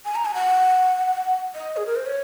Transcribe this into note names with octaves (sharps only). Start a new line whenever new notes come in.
G#5
A#5
G#5
F#5
D#5
G#4
A#4
C5
C#5